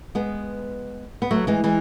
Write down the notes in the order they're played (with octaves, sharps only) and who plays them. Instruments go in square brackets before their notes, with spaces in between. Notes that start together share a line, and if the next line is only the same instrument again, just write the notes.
[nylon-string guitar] G#3 B3
B3
F#3 A3
E3 G#3
E3 G#3